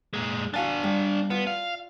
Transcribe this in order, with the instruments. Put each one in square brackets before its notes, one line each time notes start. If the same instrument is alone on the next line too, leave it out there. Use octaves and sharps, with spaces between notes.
[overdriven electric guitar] A#2 G#3
[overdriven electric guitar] D4 G#5 [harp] F#4 F5 A5
[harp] G3
[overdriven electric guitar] B3 [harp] F4
[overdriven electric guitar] F5